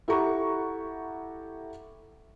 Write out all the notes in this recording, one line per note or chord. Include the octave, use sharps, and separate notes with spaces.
E4 G4 A4 F#5 A#5 C#6